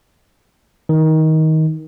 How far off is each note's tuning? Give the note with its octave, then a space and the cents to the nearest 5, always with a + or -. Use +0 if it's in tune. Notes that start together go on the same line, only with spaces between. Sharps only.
D#3 +20